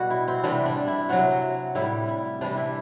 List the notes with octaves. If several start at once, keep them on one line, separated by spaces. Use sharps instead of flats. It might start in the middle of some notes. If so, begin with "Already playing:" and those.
Already playing: B2 G3 F#4
E4
C4
C3 E3 G3 D4
D4
E4
C3 F#3 F#4
A2 G3 E4
E4
C3 E3 G3 D4
E4